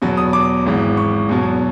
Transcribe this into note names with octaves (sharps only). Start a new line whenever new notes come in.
E2 B2 F#3
D#6
D6
G#1 G#2 E3
C#6
E2 B2 F#3